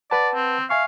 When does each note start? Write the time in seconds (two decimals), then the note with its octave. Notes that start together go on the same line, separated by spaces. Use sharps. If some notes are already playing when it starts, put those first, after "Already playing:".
0.11 B4 D5 F#5 A5
0.35 C4
0.70 E5 F5 G#5 C#6